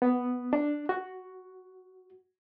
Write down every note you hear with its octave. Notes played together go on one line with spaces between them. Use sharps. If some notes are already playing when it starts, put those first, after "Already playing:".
B3
D4
F#4